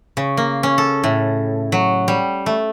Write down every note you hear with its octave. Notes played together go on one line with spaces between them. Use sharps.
C#3
A#3
C#4
A4
A2
F#3
G3
A3